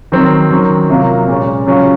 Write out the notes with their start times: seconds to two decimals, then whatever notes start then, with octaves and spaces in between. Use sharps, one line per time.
0.12 D#3 F#3 C4
0.51 D#3 F#3 C#4
0.90 C3 F#3 A#3 F4
1.28 A#2 G#3 C#4
1.67 C#3 F#3 C#4 F4